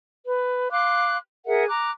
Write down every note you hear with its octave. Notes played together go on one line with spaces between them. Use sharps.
B4
F5 C6 D6 F#6
G#4 A#4 E5 F#5
A#5 D6 F#6